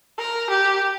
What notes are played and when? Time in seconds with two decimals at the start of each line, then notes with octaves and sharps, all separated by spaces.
0.18 A#4
0.50 G4